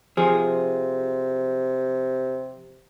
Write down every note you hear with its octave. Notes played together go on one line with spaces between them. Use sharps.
C3 F3 G#4